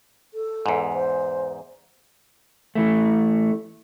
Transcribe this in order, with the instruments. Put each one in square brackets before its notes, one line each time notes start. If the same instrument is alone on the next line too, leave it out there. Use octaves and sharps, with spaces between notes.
[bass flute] A4
[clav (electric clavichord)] E2 G#2
[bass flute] C5
[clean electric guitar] E3 A3